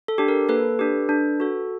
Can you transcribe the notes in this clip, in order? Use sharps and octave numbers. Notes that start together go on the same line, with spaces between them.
A4
D4 G4
A#4
A#3 A4 B4
D4 G4
D4
F#4 A4